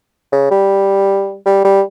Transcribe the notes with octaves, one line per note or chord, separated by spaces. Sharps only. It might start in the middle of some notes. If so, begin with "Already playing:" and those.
C#3
G3
G3
G3